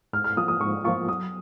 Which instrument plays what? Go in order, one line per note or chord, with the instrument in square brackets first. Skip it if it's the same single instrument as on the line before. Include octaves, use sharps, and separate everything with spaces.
[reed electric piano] G#2 [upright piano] F6
[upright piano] F6
[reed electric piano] F3 A#3 F4 [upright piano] D#6
[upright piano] D#6
[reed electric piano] G#2 [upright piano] C#6
[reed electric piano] F3 A#3 F4 [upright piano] C#6
[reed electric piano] F#3 [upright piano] D#6